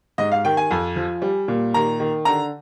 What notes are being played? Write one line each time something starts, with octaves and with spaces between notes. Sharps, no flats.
G#2 D#5
F5
D#3 G5
G#5
F2
F3
G3
A#2
D#3 A#5
D#3
D3 A#5